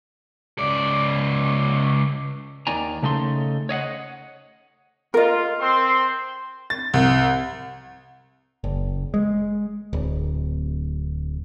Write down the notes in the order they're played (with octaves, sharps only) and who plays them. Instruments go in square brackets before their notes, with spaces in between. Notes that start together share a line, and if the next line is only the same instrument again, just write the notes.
[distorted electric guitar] C#2 D5
[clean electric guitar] D#2 D#3 D5 G#5 A#5
C#3 A3 D#4 A4 C6
C#5 D#5 F5 F#5
[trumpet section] F4 [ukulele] A#4 D#5
[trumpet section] C4 C6
[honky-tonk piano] A6
C2
[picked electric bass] F#1
G#3
D1